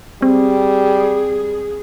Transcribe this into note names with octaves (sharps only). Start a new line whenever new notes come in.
G3 C4 G#4